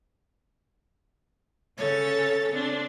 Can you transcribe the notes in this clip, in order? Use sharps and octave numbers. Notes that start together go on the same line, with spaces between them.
C#3 C#4 A4 C#5 A6
C4 D4